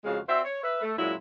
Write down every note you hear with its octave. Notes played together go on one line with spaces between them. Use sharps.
F2 C#3 G#3 F#4 F5
C4 F#4 C5 D5 E5
C#5
B4 E5
A3
F#2 A#2 F#3 G#3 E4